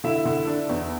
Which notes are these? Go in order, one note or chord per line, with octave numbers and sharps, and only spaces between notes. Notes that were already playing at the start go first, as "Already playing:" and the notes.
D3 E4 E5
D3
D4
E2